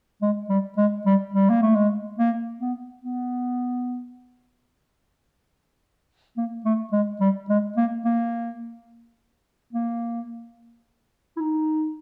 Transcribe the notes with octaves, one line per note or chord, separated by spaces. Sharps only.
G#3
G3
G#3
G3
G3
A#3
A3
G#3
A#3
B3
B3
A#3
A3
G#3
G3
G#3
A#3
A#3
A#3
E4
D#4